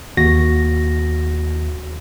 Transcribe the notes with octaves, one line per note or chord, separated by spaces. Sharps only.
D#2 F#4 A#6